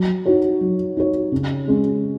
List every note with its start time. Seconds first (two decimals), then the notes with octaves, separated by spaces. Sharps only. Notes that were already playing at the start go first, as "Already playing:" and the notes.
Already playing: F#3
0.26 D#4 F#4 C#5
0.61 F#3
0.97 D#4 F#4 C#5
1.32 C#3
1.68 G#3 C#4